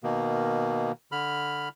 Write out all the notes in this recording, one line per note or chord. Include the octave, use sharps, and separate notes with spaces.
B2 D#3 A#3
D3 B5 F6